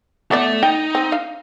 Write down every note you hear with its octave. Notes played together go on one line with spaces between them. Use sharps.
E3 B3 A4 D5 E5
D#4 G5
C4
F5